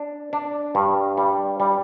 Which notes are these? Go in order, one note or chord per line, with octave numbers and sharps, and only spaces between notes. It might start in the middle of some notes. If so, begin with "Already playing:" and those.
Already playing: D4
D4
G2
G3
G3